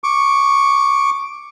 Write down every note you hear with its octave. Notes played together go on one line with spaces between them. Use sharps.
C#6 D6